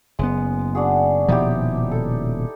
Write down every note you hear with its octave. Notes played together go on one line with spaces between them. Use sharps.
F#1 G#3 B3
D4 F#4 G#4
D#1 B2 F3 D#4 E4 G4
A4